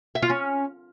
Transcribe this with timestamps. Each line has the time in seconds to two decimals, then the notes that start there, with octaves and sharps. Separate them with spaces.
0.15 E5
0.22 F4
0.30 C#4